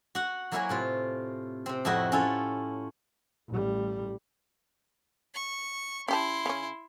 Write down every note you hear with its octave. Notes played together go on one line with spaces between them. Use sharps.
F#4 F#5
F#3 A#3 E4 A#4 C#5 G#5
A2 C3 F4
C3 C4
F2 A2 E4 F#4 D#5 G5
C#4 E4 F4 A4
A1 G3
C#6
C#4 E4 G4 A5 C6
C#3 C#4